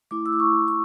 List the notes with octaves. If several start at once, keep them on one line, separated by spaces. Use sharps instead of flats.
A3 E4 D6
E6
D6
C#6
C#6